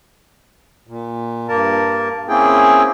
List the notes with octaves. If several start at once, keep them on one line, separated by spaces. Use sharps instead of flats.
A#2
G2 A#3 A#4 A5
A#3 C4 C#4 E4 G#4 G5